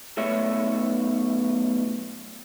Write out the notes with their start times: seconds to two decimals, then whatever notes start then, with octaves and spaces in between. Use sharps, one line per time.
0.18 B1 B2 A3 C#5 E5